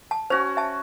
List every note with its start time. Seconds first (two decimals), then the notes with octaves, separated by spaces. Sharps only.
0.11 A5
0.30 C#4 F#4 C5
0.57 E5 A5